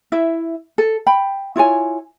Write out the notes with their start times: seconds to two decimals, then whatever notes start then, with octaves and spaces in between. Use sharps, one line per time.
0.12 E4 E5
0.78 A4
1.07 G5 B5
1.56 E4 F4 C#5 G#5